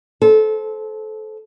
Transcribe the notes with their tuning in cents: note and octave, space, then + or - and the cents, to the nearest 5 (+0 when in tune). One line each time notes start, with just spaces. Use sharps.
A4 -25 C5 +0